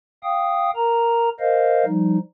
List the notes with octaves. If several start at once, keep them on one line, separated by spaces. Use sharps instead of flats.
F5 G5 D#6
A#4 A#5
A#4 C5 D#5 F5
F3 G3 D#4